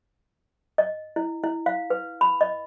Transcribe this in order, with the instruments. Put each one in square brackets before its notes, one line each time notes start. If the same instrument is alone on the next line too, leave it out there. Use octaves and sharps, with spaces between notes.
[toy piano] D#5
E4
E4
F5
B4
B5
D#5